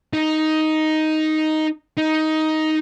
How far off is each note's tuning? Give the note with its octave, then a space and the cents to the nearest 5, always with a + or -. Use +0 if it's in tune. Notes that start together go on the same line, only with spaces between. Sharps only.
D#4 +5
D#4 +10